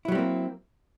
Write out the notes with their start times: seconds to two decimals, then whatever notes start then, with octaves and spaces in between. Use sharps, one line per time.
0.05 E4
0.08 F#3
0.12 G3
0.15 C4
0.19 A#3